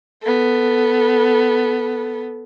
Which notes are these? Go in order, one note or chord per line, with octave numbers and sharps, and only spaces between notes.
B3 A4